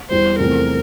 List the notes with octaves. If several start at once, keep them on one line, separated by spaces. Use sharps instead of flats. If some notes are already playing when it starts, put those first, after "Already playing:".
E2 E3 G3 C5
E2 C3 F3 A3 C4 A#4